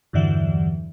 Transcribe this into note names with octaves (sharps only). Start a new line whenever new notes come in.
E2 G2 D3 E3 F#3